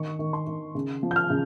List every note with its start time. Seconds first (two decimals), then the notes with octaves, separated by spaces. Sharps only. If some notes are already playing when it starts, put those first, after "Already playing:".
Already playing: D#3 C#6
0.19 D#3
0.33 C6
0.47 D#3
0.75 C#3
1.03 F3
1.11 G6
1.16 F6
1.30 C#3